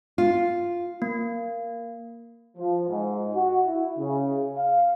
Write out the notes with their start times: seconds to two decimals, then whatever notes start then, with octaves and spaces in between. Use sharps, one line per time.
0.18 F4
1.02 A#3
2.58 F3
2.89 G#2
3.34 F#4
3.67 E4
3.98 C#3
4.57 F5